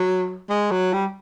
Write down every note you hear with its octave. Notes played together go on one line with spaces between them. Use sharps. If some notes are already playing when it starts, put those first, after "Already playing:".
Already playing: F#3
G#3
F#3
G3